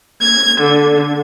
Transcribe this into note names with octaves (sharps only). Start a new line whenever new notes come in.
G#6
D3